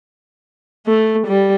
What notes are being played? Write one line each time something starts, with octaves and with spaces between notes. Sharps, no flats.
A3
G3